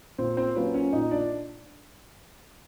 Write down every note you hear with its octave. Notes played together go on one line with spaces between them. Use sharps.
A#2 C4 C5
C4 C5
F#3 A#3 C#4 F4 B4
C#4 C#5
A#2 D#4 D#5
D4 D5